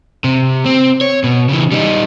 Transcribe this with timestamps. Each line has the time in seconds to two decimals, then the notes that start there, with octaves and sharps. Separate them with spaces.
0.24 C3
0.66 C4
1.01 C#5
1.24 B2
1.49 C#3 E3
1.72 G3 D#4